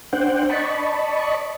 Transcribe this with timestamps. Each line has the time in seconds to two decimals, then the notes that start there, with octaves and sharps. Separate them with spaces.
0.13 D4 C5 F#5 G5
0.50 D5 D#5 A5 B5 C#6